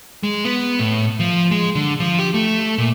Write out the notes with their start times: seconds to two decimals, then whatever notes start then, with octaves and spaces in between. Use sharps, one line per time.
0.23 G#3
0.45 B3
0.79 A2
1.20 F3
1.51 G#3
1.75 D3
2.00 F3
2.19 G4
2.34 A3
2.78 A#2